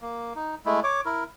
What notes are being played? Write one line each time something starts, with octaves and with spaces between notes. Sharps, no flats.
A#3
D#4
G#3 A3 E4
C#5 D6
E4 A#4